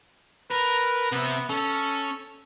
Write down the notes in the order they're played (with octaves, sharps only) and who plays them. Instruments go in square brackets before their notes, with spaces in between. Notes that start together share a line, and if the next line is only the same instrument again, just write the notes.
[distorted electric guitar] A#4 [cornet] B4
[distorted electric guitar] C3 E5 [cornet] B3
[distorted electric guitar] C#4 [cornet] A4